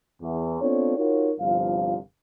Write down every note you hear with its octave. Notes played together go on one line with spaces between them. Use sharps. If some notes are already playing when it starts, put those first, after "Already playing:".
E2
B3 C4 D4 F4 A4 C#5
D#4 F4 F#4 A#4 C#5
G1 C2 F3 F5